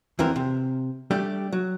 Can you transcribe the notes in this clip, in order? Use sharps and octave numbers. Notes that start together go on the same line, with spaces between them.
E2 D3 E3 F3 C4 A#4
C3
G3 A3 D4 G4
F#3